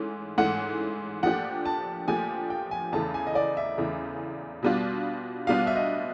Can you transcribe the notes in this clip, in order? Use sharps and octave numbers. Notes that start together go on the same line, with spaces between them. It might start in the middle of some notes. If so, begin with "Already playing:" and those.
Already playing: G#2 E3 A3 C#4
G#2 E3 A3 C#4 F#5
A#2 F3 A3 D4 G4 F#5
A5
A#2 F3 A3 D4 G4 G#5
G5
G#5
E2 C#3 E3 A3 A5
G#5
D#5
D5
E5
E2 C#3 E3 A3
B2 G3 B3 D4 F4
B2 G3 B3 D4 F4 F5
E5
D#5